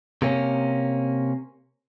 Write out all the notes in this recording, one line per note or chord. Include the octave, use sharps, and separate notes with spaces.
C3 A#3 C#4